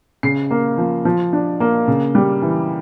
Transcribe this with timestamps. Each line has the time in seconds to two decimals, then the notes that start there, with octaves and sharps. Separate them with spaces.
0.23 C#3 C7
0.51 A#3
0.78 F3
1.05 F3
1.33 D4
1.60 A#3
1.88 C#3
2.15 G3
2.42 E3